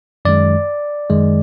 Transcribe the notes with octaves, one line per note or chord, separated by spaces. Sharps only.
F#2 D#3 G#3 D5
F#2 D#3 G#3